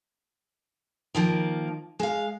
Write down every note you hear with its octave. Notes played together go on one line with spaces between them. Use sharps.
D#3 F3 A#3
G#3 F5